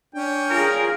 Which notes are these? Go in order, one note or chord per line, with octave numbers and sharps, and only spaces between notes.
C#4 D4 G5
F4 G#4 A#4